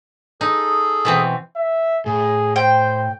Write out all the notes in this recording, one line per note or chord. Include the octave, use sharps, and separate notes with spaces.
D#4 G#4 A4
B2 E3 C4
E5
A2 G#4
C5 G5